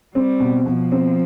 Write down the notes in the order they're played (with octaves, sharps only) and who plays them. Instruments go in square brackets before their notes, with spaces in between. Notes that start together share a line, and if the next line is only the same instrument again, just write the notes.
[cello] G3 [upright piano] C4
[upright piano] B2
[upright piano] B2 [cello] F3
[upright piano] C4